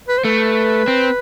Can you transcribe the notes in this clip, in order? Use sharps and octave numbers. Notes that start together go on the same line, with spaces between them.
B4
C5
A3 B4
C4